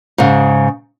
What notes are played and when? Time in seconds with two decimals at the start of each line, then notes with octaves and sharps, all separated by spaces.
0.18 G#2 C#3